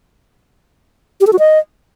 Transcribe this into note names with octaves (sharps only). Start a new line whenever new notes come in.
G4
A4
F#4
D#5